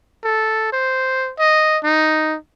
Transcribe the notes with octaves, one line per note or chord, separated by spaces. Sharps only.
A4
C5
D#5
D#4